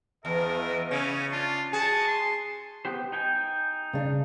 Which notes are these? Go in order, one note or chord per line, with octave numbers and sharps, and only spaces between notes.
E2 B3 A#4 D#5 E5
C#3 C#4
D4 F4 D5 A5
F#4 G#4 A5
C6
B3 G4 C5
D#4 G5 G#5
C#3 D4